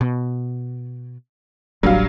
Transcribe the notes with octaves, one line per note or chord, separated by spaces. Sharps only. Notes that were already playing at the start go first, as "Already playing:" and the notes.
B2
D#1 A1 F#3 G3 D4 F5